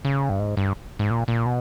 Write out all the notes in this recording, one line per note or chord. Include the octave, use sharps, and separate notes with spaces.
C#3
G2
G#2
G2
G#2
A#2
A#2
B2